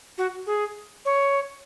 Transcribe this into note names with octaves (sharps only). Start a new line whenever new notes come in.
F#4
G#4
C#5